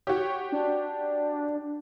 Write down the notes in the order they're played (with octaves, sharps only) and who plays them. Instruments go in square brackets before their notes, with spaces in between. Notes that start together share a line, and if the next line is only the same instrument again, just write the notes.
[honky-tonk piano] F#4 G4 [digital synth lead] C#5
[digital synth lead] D4